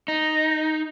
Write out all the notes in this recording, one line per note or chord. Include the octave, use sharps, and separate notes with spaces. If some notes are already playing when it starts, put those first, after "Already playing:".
D#4